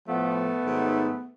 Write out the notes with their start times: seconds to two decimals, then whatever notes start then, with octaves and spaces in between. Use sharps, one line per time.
0.08 A2 F3 A3 B3
0.64 G#2 D#3 F#3